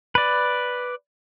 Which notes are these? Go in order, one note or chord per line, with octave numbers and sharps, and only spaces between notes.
B4 D5